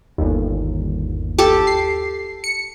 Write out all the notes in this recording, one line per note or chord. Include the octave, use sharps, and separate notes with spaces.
G1 D#2
G4 A4 A5
C7
C#7